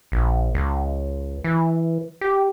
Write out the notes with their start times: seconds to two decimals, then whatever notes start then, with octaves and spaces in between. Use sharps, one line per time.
0.12 A#1
0.54 C#2
1.44 E3
2.21 G4